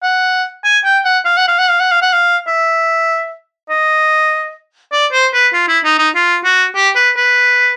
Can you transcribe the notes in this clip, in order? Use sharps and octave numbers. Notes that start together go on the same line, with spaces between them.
F#5
G#5
G5
F#5
F5
F#5
F5
F#5
F5
F#5
F5
F#5
F5
E5
D#5
D5
C5
B4
F4
E4
D#4
D#4
F4
F#4
G4
B4
B4